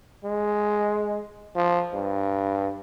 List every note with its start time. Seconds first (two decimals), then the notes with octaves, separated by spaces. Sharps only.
0.25 G#3
1.55 F3
1.94 G2